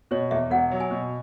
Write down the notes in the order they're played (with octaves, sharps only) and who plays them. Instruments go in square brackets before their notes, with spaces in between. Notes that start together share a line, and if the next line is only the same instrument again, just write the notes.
[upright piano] B2 [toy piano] C#5
[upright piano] E2 [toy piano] E5
[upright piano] E1 [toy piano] F#5
[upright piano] F#3
[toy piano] G#5
[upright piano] B2